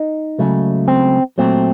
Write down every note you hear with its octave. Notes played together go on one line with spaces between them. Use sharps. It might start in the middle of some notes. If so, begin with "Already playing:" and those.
Already playing: D#4
C#2 C#3 F#3 A3
C4
A#2 F#3 A3 C4